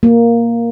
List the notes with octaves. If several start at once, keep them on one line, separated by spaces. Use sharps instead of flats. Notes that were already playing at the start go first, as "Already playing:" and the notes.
A#3